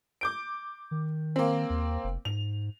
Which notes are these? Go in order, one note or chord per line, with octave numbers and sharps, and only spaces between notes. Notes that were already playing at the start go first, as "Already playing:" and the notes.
D6 G6 D7
D#3
A#3 C4
D#2
F1
G#2 F7